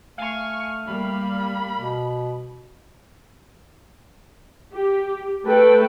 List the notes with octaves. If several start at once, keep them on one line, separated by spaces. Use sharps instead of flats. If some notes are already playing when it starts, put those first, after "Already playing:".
A3 F5 G#5 C#6
G3 A#3 B5
B2
G4
A3 A4 B4 G5